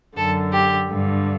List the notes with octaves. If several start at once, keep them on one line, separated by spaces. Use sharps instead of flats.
F#2 D3 A4
G4
G2 D3